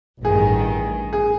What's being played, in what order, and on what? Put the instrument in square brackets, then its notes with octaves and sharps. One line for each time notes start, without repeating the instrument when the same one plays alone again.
[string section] A1 G2 D#3 [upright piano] G#4
[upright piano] G#4